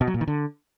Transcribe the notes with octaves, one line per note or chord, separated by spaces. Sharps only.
B2
F#3
A#2
D#3
D3